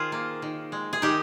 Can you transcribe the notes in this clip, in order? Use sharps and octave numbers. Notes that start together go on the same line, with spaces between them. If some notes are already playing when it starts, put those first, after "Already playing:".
Already playing: D#3 F4 G#4 C5
A#3
D#3
G#3
G#4
D#3 D#4 G4